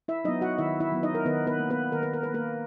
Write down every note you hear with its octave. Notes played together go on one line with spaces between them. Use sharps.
E4 E5
F#3 B3 D#4 D#5
F#4 F#5
D#3 E4 E5
E4 E5
F#3 B3
D#4 D#5
A#4
D#3 B3 B4
B3 B4
A#3
B3 B4
D#3 A#4
B4
A#4
A#3 B4
A#3 A#4